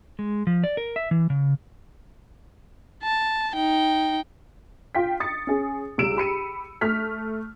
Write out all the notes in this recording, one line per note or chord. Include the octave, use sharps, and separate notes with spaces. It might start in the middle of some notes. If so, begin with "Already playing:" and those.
G#3
F3
D5
A#4
E5
E3
C#3
A5
D#4 G5
F4 G5 B6
D#6 A6 C#7
C#4 G#4
C#2 G3 E6 D7 E7
G4 B5 C#7 D#7
A3 F6 B6